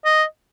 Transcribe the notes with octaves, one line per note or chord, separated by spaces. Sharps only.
D#5